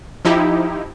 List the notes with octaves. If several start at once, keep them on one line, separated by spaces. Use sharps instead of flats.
F3 D#4 E4 G4